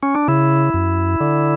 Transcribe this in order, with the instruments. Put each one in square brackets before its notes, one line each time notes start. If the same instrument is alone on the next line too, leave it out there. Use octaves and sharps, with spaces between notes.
[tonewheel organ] C#4
D4
C#3 E4
F#2
D3